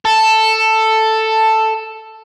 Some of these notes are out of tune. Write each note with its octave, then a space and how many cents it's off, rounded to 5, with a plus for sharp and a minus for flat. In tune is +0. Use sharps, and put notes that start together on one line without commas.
A4 +5